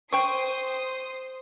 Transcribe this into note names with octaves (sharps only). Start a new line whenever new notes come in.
C5 G5 C#6 D#6 C7